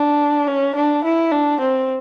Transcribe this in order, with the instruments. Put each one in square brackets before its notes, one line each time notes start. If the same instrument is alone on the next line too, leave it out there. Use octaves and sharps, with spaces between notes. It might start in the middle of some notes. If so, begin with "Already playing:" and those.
Already playing: [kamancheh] D4
C#4
D4
E4
D4
C4